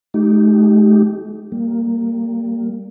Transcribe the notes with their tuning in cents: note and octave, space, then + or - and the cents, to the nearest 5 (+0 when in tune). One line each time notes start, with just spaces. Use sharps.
G#3 +45 D#4 +0 G4 -20
G3 +0 A#3 -10